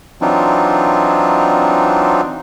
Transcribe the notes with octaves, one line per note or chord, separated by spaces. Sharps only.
E3 F#3 C4 D4 D#4 F4